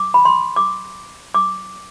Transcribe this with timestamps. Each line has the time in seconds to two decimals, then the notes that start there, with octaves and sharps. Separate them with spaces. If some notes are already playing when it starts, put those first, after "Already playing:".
Already playing: D6
0.14 B5
0.25 C6
0.56 D6
1.34 D6